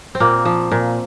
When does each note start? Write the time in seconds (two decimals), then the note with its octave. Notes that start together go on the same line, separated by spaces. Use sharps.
0.15 C4
0.20 A#2 A#3
0.45 F3
0.71 A#2